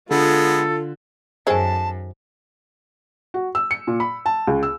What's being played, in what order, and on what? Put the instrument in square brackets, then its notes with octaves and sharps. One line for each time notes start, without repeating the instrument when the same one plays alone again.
[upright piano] D3 [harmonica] G#3 B3 [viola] F4 [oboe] A4
[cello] F#2 [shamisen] D#3 G#4 A4 [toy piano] C5 G#5 [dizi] A5
[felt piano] F#4
E6
C#7
A#2
B5
A5
C#2
E6